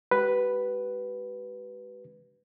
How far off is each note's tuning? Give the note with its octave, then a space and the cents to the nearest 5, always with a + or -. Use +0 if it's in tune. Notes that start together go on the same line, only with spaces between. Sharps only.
G#3 +0 G4 -40 B4 +0